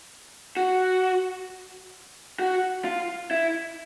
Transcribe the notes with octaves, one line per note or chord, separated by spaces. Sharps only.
F#4
F#4
F4
E4